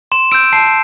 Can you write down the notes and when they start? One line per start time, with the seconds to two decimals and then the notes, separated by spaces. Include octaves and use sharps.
0.12 C6 E7
0.32 E6 G6 D7
0.53 A5 C7